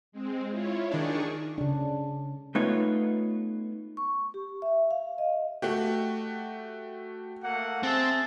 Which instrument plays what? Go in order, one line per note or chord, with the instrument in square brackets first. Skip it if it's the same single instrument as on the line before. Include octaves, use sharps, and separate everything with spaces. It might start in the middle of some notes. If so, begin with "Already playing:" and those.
[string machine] G#3 C4
E4 F4 C#5
[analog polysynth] D#3 D4 [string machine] G#4 C#6
[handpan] C#3 D4
[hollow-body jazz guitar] A3 B3 D#4 F4 B4 C#5
[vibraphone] C#6
G4
E5
F5
D#5
[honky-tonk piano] A3 F#4 G4
[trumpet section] A3 A#3 F#5
[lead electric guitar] C4 [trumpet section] G#4 E5 A5